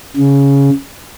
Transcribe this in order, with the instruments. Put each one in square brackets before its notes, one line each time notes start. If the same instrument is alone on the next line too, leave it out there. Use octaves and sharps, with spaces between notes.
[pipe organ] C#3